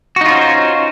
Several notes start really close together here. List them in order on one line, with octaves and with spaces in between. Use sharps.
F#4 D#4 F4 C#4 C5